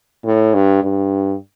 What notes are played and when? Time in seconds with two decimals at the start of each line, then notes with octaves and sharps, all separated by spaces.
0.25 A2
0.54 G2
0.83 G2